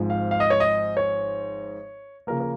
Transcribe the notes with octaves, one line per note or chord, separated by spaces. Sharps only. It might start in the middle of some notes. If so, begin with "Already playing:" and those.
Already playing: G#1 G#2 F3
F5
F5
D#5
C#5
D#5
C#5
C#3 F3 A#3 A#4
A#4